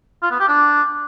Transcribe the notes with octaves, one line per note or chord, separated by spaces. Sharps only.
F4
B3
G4
D4